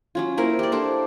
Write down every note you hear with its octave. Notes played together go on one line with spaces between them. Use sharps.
F#3 C#4 F4
A#3 E4 A#4 C5
G4 D5
D4 A4 C5